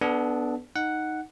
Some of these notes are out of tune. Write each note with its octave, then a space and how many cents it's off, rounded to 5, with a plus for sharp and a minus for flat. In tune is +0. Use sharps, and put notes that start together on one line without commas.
B3 +0 D4 +0 A4 -35
D#4 +0 F#5 +0